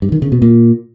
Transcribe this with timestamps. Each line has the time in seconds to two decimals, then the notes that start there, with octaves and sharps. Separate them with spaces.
0.02 G2
0.12 D#3
0.22 C#3
0.32 B2
0.42 A#2